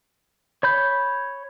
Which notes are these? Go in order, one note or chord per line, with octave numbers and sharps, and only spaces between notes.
C#5 B5 G6